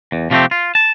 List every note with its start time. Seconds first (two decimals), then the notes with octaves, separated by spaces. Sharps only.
0.12 E2
0.31 C3 F3 G3 A3 C4 G4
0.51 F4
0.75 A5